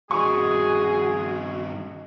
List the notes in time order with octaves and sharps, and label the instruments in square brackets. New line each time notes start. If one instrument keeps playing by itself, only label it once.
[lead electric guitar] G2 D#3 [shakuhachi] F#4 [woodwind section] G#4 [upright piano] C#6